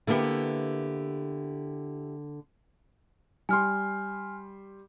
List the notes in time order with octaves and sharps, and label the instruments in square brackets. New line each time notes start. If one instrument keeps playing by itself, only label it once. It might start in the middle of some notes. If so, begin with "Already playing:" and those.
[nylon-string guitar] D3 A#3 B3 [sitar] E4 G4
[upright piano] G3 C6 [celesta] G#5 F6